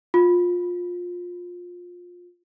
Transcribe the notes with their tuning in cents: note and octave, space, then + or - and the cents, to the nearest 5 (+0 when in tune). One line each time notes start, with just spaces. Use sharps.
F4 +20